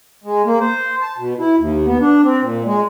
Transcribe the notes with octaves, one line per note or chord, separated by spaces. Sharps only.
G#3
A#3
C5
A5
B2
E4
D#2
B3
D4
C4
A#2
G#3